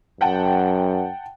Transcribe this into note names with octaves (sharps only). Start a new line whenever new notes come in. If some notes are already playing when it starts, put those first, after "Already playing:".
F#2 F#5 G5 A5